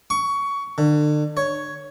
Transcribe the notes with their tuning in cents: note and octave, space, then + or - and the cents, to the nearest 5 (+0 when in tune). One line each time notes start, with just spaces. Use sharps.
C#6 +20
D3 +35
C#5 +5